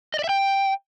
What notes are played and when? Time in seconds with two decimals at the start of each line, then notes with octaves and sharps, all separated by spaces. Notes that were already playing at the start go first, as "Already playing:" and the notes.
0.14 D#5
0.19 D5
0.24 E5
0.29 G5